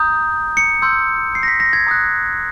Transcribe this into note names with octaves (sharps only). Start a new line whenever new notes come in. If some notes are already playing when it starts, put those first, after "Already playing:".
Already playing: A#5 D#6 G6
C#7
C6 E6 G6
C7
A#6
B6
A#6
G#6
A#5 D#6 F#6